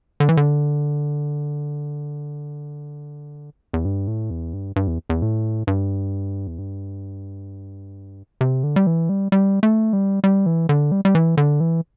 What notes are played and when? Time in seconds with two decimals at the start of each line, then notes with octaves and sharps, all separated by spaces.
0.20 D3
0.29 E3
0.37 D3
3.74 E2
3.85 G2
4.08 A2
4.30 E2
4.53 G2
4.76 G2
4.87 E2
5.10 E2
5.22 A2
5.67 G2
6.47 E2
6.59 G2
8.41 C3
8.63 D3
8.76 G3
8.87 E3
9.09 G3
9.32 G3
9.63 A3
9.93 G3
10.24 G3
10.46 E3
10.69 D3
10.92 G3
11.05 G3
11.15 E3
11.37 D3
11.60 E3